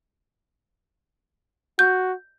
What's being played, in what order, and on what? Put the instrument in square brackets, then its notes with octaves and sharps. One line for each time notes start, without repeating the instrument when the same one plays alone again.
[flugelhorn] F#4 [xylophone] G6